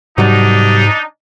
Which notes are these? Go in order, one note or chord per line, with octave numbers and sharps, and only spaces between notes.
C2 G#2 F#3 G3 D4 D#4